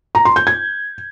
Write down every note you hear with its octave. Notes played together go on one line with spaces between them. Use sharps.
A#5
C6
G6
G#6